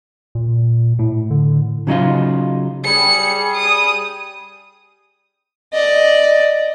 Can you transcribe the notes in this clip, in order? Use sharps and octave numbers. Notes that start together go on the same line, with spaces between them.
A#2
A2
D3
C#3 F#3 D#4 F4
G3 G#4 C#7
D#6
D5 D#5